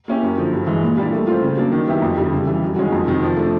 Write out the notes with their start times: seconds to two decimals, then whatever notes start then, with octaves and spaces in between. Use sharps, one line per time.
0.08 A#3 C#4 E4 G4
0.23 F#2
0.38 D3 F3
0.52 G2
0.67 E3 G#3
0.83 A#2
0.97 G3 A#3 D4
1.12 A3
1.27 C4 F4
1.42 C#3
1.57 F#3 A#3 D4
1.72 D#3
1.87 F#3 B3 E4 G4
2.02 F2
2.18 D3 G3
2.32 C#3
2.47 E3 G3
2.63 F#2
2.76 D#3 G#3 C#4 F#4
2.92 F2
3.07 C3 D#3
3.22 F3
3.37 A3 D4